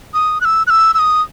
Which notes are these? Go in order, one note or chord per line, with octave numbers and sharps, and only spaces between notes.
D#6
F#6
E6
F#6
E6
E6
D#6